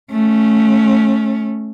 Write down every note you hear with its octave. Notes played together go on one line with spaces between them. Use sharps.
A3 C#4